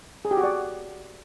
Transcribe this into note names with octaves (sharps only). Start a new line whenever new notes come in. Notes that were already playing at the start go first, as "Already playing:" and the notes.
G#4
G4
F#4
D5